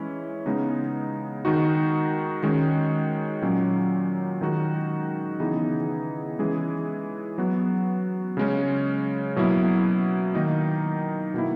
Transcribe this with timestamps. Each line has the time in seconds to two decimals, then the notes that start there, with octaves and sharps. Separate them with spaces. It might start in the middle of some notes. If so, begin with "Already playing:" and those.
Already playing: E3 G#3 C#4 E4
0.46 C#3 G#3 B3 D#4
1.45 D#3 G#3 D#4 F#4
2.43 D#3 G#3 C#4 F#4
3.42 A#2 F#3 C#4
4.41 D#3 G#3 D#4 F#4
5.40 C#3 E3 B3 D#4 G#4
6.39 E3 G#3 C#4 G#4
7.38 F#3 B3 F#4
8.37 C#3 G#3 C#4
9.36 B2 F#3 A#3 E4
10.35 D#3 A#3 D#4
11.34 B2 A#3 E4